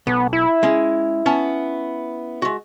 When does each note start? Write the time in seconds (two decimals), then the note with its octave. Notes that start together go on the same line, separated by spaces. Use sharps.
0.07 B1 B3
0.33 E4
0.63 G#3 C#4
1.26 B3 C#4 A5
2.42 G#3 F#4